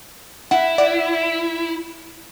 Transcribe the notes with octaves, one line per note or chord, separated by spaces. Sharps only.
E4 F#5
D5 F#5